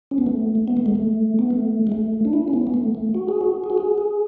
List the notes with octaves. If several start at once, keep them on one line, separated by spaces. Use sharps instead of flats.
C#4
B3
A3
B3
A3
G#3
A3
B3
A3
G#3
A3
D4
E4
C#4
B3
B3
A3
A3
F#4
G#4
F#4
G#4
F#4
G#4
G#4